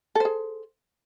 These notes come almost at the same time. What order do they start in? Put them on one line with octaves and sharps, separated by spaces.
A4 C5 G#4